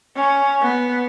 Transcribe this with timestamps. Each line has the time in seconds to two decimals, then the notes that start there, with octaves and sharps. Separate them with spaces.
0.16 C#4
0.62 B3